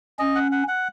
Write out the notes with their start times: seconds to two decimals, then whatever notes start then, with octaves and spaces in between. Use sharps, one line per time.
0.19 C#4 D#5
0.35 F#5
0.52 F#5
0.68 F#5